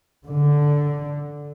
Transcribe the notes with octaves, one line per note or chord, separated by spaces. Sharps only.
D3